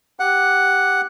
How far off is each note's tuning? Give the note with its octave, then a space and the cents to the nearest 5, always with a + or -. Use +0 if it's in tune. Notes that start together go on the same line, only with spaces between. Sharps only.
G4 +0 F#5 +0